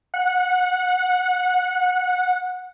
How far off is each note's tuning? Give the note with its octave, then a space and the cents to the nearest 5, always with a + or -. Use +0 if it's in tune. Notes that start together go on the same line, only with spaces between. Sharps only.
F#5 -20